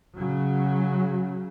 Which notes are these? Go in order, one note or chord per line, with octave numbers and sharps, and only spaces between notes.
C#3 F#3